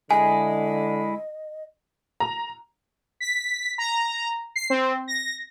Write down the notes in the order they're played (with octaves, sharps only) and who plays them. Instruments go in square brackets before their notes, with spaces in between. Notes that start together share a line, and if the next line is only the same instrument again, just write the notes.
[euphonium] D3 [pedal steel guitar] G#3 E4 G#4 [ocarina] D#5 [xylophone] G#5
[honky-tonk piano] A#5
[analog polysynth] B6
A#5
C7
C4
A#6